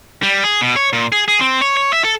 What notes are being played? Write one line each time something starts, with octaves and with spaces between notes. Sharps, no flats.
G3
G#4
B2
C#5
A#2
G#4
G#4
C4
C#5
C#5
E5
A4